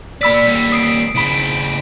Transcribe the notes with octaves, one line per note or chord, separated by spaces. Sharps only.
A#3 D5 B5 E6 B6
G3 A#3
D#6 C7 D7
C#3 E4 B5 D7